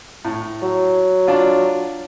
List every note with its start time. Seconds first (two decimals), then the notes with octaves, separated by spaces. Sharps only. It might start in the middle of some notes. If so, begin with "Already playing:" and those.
0.25 A2
0.62 F#3
1.27 D4 F4